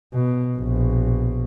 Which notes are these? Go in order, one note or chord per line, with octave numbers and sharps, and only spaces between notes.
B2
A#1 B2